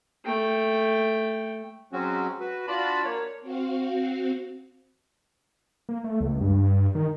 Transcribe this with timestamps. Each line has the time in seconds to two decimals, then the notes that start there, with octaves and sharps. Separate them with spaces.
0.24 A3 G5
1.92 F#3 G#3 C4 C#4 F#4
2.40 F#4 B4
2.67 D4 F4 F#4 D5 A5 B5
3.05 A#3 C#5
3.41 C4 F#4 F5
5.89 A#3
6.04 A3
6.21 C#2
6.41 G2
6.95 D#3